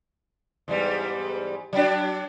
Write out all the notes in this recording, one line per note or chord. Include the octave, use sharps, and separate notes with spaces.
E2 G#2 G3
F#3 D4